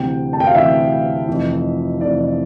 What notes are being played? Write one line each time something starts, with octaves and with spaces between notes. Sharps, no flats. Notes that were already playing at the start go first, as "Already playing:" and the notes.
Already playing: D2 C3 E3 G5
A5
G5
F5
D2 C3 E3 E5
F1 F2 E3
F1 F2 E3 D5